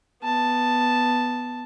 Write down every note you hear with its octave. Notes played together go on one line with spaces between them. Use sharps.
B3 A5